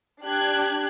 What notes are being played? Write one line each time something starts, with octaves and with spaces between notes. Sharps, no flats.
D4 G4 F#6 G#6